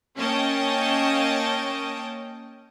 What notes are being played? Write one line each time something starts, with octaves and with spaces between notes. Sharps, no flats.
A#3 C#4 C#5 D#5 G5 A5